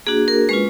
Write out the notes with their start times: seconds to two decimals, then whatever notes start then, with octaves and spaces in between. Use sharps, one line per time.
0.07 A#3 D4 F#4 G#4
0.28 A#4
0.49 G#3 C#4 F4 B4